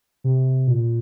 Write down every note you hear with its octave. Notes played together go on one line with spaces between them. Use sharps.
C3
A#2